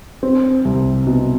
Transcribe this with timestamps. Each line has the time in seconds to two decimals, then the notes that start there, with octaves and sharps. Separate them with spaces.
0.23 C4
0.65 C2
1.07 B2